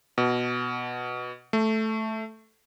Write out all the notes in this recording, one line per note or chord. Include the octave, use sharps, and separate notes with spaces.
B2
A3